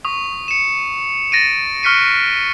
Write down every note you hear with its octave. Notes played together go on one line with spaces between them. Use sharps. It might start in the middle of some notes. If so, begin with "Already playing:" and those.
C#6 D#6
C#7 E7
A6 A#6 D7 D#7
C#6 F6 F#6 B6 C#7 D#7